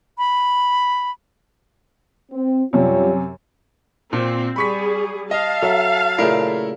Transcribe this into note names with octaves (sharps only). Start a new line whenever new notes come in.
B5
C4
F#2 C3 G3 F4 C#5
A#2 C4
G3 G#4 B5 C#6 B6
D#5 F5 A5
F#3 A4 E5
A#2 C#3 A3 E4 A#4